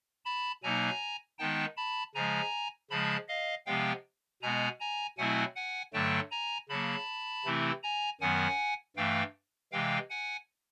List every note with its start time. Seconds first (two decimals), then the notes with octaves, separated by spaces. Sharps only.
0.25 A5 B5
0.63 B2 F#3 A#3 D#4 G#5 A#5
1.39 D#3 G#3 B3 D#4 G5 A5
1.77 A5 B5
2.15 C#3 F3 G#3 G#5 A#5
2.90 C#3 F3 G#3 A5 B5
3.28 D#5 F5
3.66 C3 F3 G#3 B3 F5 G5
4.42 B2 G#3 B3 G#5 A#5
4.80 G#5 A#5
5.18 B2 F#3 A3 C4 E4 F#5 G#5
5.56 F#5 G#5
5.93 G2 D3 F#3 A3 G5 A5
6.31 G#5 A#5
6.69 C#3 F#3 A#3 A5 B5
7.45 C3 E3 A3 C4 E4
7.83 G#5 A#5
8.21 F#2 D#3 F#3 B3 F#5 G#5
8.97 G2 E3 A3 F5 G5
9.72 C3 E3 G#3 F5 G5
10.10 F#5 G#5